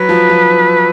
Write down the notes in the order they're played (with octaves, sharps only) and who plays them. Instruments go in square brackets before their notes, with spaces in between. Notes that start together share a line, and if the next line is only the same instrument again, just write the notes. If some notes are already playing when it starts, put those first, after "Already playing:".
Already playing: [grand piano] F#3 [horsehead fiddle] B4
[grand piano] F3
F3